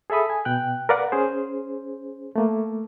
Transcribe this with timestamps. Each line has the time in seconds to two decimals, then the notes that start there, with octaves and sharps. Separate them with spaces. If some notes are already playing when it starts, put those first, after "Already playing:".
0.10 G#4 A4 E5 B5 D#6
0.30 G#5
0.45 B2 G5 F#6
0.89 A#4 B4 D5 F5 F#5
1.12 C#4 G#4 C5
2.36 A3 A#3